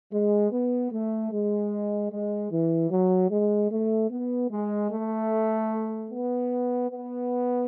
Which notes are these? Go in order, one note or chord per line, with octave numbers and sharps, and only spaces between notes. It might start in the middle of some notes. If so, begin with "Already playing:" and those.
G#3
B3
A3
G#3
G#3
E3
F#3
G#3
A3
B3
G#3
A3
B3
B3